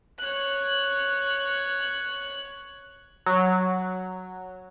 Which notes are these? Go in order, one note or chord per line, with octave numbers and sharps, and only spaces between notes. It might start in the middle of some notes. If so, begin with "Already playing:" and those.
C#5 F#6
F#3